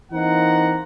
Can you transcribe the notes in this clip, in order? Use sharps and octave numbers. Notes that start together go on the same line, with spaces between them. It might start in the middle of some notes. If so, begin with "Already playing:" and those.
E3 A#3 C4 D#4 F#5 A#5